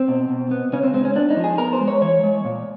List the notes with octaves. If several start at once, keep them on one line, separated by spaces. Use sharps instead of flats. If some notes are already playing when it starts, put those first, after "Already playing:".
Already playing: C4
B2
B2
B3
C#3 C#4
C4
G#3 C4
C#4
B3 D4
D#4
F3
G#4
B3 A#4
C5
G#3
C#5
E3 C#5
G#3
A#2